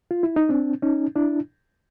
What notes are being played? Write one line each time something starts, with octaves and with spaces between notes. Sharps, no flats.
F4
E4
D#4
C4 D4
C#4 D#4
D4 E4